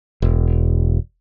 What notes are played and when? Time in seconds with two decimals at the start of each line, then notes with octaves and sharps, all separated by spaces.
0.22 E1